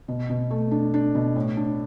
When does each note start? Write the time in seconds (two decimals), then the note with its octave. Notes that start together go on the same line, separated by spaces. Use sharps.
0.08 B2
0.30 B2
0.51 A3
0.71 D4
0.94 D4
1.15 B2
1.36 A2
1.57 D4